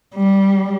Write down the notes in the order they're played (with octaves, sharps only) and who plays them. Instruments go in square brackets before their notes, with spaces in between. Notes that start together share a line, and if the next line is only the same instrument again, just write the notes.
[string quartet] G3